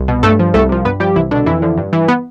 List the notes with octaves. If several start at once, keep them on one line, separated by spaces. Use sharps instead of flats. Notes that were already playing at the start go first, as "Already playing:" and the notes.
Already playing: C2
B2
G2 A3 A4
F3
C2 A3 A4
C3 F3
G2 B3 B4
F3 G3 G4
C2 E3 E4
B2 D3 D4
F2 E3 E4
D3 F3
G2
E3
B3